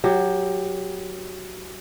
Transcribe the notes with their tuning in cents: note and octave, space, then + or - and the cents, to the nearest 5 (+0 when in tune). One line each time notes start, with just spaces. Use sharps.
F#3 +0 G4 +15